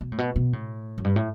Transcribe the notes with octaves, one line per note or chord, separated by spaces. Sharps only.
B2
A2
B2
B2
A2
F#2
G2
A2